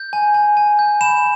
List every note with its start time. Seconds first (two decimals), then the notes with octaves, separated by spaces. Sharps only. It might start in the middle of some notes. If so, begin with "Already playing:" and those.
Already playing: G6
0.13 G#5
0.34 G#5
0.57 G#5
0.79 G6
1.01 B5 E7